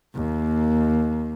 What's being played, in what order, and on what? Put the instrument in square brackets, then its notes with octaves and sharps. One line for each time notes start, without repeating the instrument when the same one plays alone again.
[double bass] D#2 A#3